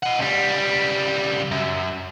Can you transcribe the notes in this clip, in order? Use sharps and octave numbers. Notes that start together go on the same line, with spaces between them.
D#5 F#5
C#2 G3
F#2